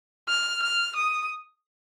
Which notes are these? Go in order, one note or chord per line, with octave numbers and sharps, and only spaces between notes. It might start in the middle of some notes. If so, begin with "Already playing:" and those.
F6
F6
D#6